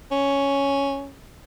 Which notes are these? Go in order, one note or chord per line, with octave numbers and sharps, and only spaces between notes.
C#4